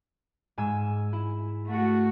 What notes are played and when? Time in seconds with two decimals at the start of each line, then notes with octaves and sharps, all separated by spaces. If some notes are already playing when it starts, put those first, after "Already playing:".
0.58 G#2 G#5 E6
1.13 E4
1.66 A3 F#4